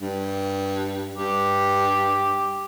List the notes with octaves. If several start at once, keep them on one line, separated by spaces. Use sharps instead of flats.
G2
G2 G4